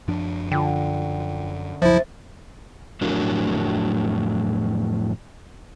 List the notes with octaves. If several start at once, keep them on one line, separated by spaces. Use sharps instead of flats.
F#2 F3 D4
D3 F4 G5
C#2 F#2 F3 E4 C5 E5 A6
F2 A2 F#3 D4 A#4